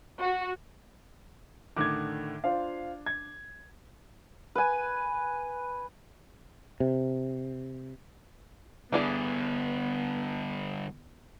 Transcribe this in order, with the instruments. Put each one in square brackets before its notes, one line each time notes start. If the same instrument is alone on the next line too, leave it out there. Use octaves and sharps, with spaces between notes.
[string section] F#4
[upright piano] A2 D3 D#3 [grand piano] D6 G#6
[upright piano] D4 [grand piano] F4 C5 F5
[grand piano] G#6
[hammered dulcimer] B4 G#5
[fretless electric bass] C3
[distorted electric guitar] D3 G3 [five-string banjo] E3 D4 G#4 [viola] B3